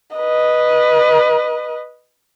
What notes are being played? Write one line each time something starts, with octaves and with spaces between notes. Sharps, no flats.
B4 D#5